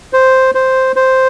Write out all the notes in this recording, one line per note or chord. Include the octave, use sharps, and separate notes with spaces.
C5
C5
C5